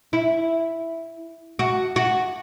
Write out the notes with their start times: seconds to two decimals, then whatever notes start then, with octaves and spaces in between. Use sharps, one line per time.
0.13 E4
1.59 F#4
1.96 F#4